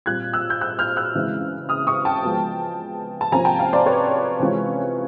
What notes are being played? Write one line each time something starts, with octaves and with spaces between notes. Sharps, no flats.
A#2 G3 C4 F#6 G#6
E6 F#6
G6
E6 F#6
F6 G6
E6 F#6
C#3 E3 G#3 C4 E4
D#6 F6
C#6 D#6
G5 A5
F3 G#3 B3
A5
C3 F3 A#3 C#4 F4 G#5 A#5
G5 A5
F5 G5
C5 D5
B4 C#5
C3 E3 G#3 C#4 F4